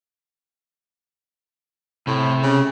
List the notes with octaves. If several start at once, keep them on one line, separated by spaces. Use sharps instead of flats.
A2 C3
C#3